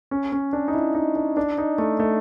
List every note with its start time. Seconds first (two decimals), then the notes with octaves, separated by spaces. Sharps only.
0.11 C#4
0.32 C#4
0.53 D4
0.68 D#4
0.74 E4
0.95 D#4
1.16 D4
1.37 D4
1.58 D#4
1.78 A3
2.00 A3